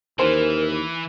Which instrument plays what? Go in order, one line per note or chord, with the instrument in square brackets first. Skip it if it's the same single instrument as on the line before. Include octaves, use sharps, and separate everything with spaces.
[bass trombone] D#2 [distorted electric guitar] E3 [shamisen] C#4 C5 [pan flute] A#4